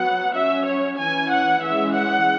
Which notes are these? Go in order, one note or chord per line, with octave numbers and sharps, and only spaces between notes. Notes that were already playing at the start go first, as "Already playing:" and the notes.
Already playing: F#3 B3 F#5
F#3 C#4 E5
C#5
E3 C#4 G#5
F#5
E3 G#3 C#4 E5
F#5